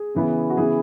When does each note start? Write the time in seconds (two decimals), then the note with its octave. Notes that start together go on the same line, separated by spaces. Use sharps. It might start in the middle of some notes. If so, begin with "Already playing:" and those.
Already playing: G#4
0.15 C#3 E3 B3
0.50 F#4
0.57 C#3 E3 B3 G#4